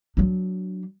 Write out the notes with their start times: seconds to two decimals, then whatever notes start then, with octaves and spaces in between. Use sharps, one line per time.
0.17 F#3 D4